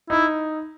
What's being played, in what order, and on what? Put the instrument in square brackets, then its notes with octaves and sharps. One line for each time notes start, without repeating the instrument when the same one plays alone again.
[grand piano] D#4 [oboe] E4